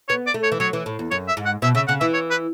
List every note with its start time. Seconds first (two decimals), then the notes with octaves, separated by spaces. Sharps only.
0.09 B3 C#5
0.27 D5
0.34 A3
0.43 C#5
0.52 E3
0.60 F#3 C#5
0.73 E3
0.86 A2
0.99 E2
1.11 F#2 C#5
1.28 E5
1.37 G#2
1.45 F#5
1.62 B2 E5
1.75 C#3 E5
1.88 C#3 F#5
2.00 E3 E5
2.14 C#5
2.30 B4